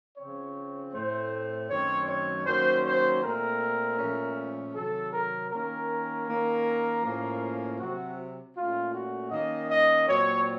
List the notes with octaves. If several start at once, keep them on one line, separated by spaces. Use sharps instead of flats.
C#3 F3 C4 C#5
A2 A3 C4 C5
F#2 D#3 F#3 A3 C4 C#5
C#5
D#3 F#3 A#3 C#4 C5
C5
A#2 A3 C4 A#4
A#2 F3 A3 C#4
C3 D#3 F#3 C4 A4
A#4
D#3 A#3 C#4 A#4
D#3 A#3 C#4
A2 F3 A#3 C#4
C3 F#3 C4 F#4
A#2 A3 C#4 F4
F#4
D#3 A#3 C#4 D#5
D#5
A#2 F#3 C4 C#5